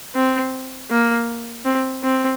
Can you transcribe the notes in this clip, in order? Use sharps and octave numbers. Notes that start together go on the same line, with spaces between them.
C4
A#3
C4
C4